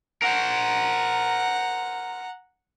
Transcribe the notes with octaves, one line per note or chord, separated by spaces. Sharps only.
A#4 C5 F#5 A#5